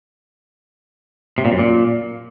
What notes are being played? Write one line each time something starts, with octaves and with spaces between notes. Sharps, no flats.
C3
A#2
F#2
A#2